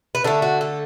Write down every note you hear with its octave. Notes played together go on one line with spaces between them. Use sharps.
B4
D3 A3 A4
F#4
A4